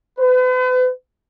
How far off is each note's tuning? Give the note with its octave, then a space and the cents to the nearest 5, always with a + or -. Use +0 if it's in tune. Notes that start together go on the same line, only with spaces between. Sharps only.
B4 +40